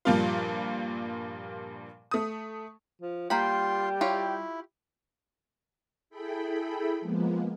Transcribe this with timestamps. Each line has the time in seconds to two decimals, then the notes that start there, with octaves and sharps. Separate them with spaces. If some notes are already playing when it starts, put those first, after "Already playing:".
0.05 G2 A#2 F3 G3 A#3 F4
2.11 A3 D#6
3.02 F3
3.30 G3 A#3 F4 G5 B5 C6
4.01 E4 F4 G4 C#5
6.10 E4 G#4 A4 G5 B5
7.01 F3 G#3 A#3 B3